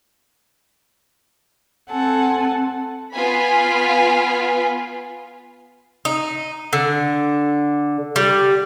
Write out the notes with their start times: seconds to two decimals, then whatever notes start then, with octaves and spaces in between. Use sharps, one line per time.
1.90 C4 A4 F#5 G#5 A5
3.15 B3 F4 G#5 B5
6.05 D#4
6.73 D3
8.16 G3